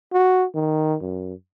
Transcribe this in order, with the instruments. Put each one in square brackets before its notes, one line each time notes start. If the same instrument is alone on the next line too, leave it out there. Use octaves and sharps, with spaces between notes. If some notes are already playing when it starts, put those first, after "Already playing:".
[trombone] F#4
D#3
F#2